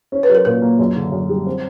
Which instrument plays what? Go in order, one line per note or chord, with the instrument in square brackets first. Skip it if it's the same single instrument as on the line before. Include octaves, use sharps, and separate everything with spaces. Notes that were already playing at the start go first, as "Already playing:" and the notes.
[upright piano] C#4
[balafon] B4
[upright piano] F#3
[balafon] A#4
[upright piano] A#2 [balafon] A#4
[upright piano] A#3
F#2
D3
F#2
G3
C4